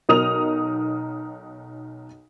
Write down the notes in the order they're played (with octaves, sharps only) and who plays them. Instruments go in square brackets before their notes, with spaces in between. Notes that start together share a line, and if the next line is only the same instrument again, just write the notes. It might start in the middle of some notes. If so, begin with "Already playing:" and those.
[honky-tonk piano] B1 D#4 A#4 D#6 F7